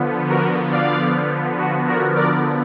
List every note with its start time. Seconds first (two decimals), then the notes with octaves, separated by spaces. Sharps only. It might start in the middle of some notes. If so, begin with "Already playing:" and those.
Already playing: D3 F3 B3
0.29 F#4 A#4
0.72 D5 F5
1.58 F#4
1.87 F#4 A#4
2.15 A#4 D5